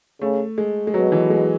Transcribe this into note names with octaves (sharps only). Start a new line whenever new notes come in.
C#3 A3
G#3
G#3
B2 F#3
E3
G#3